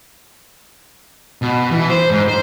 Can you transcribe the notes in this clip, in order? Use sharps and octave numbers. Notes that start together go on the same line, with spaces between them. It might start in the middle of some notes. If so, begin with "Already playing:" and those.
B2
E3
C5
G#2
C5